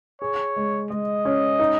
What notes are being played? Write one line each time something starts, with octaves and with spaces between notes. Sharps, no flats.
G#4 C#5
G#3
G#3 D#5
C#4
D#4